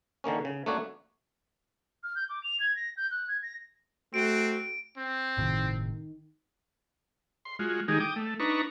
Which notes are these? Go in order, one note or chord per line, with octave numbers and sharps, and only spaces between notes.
D3 D#3 A#3 C#4
C#3
A3 A#3 D4 F#4 C#5
F6
G6
D6
F7
G#6
A#6
G6
F#6
G#6
A#6
A3 C4 F#4 D7
C4
G1 A2 C3 D#3
C6
G#3 F4 F#4
D#3 G#3 D#4 G4 G#4
G5 D6 D#6
A3
D4 D#4 B4 A#5 C#6